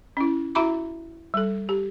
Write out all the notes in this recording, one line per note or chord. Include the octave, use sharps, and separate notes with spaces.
C#4 E4
E4 F#4 E5 A#5 B5 D6
G3 A4
G4